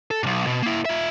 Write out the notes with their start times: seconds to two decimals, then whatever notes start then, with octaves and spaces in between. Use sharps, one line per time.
0.11 A4
0.23 B1 G#2
0.47 B2
0.63 A#3 E4
0.85 F4 E5